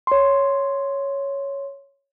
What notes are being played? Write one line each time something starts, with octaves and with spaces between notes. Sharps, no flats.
C#5 C6